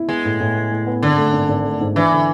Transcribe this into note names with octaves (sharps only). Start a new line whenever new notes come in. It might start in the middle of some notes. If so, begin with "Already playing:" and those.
Already playing: E4
G#3 B3
A2
A2
B3
A2
B3
G#1 D3
A3
G#1
G#1
A3
G#2
E3 D4
D3